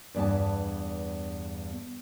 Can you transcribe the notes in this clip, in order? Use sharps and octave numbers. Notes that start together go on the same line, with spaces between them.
E2 G2 B3 B4 A5